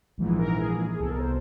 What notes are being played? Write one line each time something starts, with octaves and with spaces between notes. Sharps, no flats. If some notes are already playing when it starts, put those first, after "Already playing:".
A#1 G#2 E3
A#4
G#4
G#4
C2 B2 A4
A#4
C5